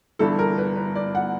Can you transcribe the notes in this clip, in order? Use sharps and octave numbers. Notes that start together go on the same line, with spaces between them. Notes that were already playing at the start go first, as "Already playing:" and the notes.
G1 G2 E3 A4
A#4
B4
B4
D5
F#5